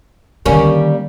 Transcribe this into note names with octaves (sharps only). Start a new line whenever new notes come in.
D3 D#3 G3 A#3 C#4